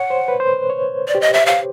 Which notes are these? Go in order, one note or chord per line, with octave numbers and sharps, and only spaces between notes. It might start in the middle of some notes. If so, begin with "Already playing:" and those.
Already playing: C#5 F#5
C5
B4
C5
C#5
D5
G4
D#5
E5
F5